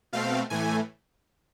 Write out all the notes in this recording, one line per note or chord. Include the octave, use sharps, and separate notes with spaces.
B2 A3 C4 F5
A2 E3 A3 G#5